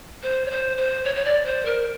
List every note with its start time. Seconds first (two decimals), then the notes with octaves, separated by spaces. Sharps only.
0.23 C5
0.46 C#5
0.51 C5
0.77 C5
1.04 C#5
1.15 C#5
1.25 D5
1.45 C5
1.65 A#4